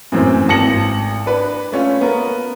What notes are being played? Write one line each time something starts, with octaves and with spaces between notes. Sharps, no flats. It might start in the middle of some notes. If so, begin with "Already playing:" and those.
F#2 A2 E3 C4
G#1 A5 A#6 C#7 F#7
D4 B4
A3 C#4 F4
B3 A#4